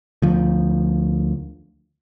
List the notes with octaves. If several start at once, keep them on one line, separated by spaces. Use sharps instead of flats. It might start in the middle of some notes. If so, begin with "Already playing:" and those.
D2 F3